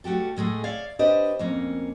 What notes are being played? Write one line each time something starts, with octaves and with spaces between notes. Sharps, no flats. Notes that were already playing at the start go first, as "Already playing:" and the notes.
G3 A3 F#4 G4 A4
A2 G#3 A3 G#4
C#5 D5 E5 F5
D4 G4 B4 C5 D#5
F2 A#3 C#4